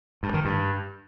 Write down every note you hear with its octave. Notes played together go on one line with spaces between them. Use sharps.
G2
D#3
G2